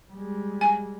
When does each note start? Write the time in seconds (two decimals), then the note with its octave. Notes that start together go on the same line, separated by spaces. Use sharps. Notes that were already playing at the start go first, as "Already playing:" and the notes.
0.12 G3 G#3
0.61 G#5